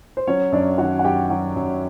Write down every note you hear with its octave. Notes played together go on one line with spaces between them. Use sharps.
C5
F#3 C#4 C#5
F#2 D4 D5
D#3 F#4 F#5
F#5
F#2 G4 G5
F#3
F#2